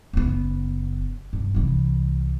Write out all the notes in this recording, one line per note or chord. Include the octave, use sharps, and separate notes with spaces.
F#1 B3
G2
C2 E3